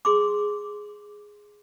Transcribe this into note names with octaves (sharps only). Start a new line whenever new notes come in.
G#4 C6 D6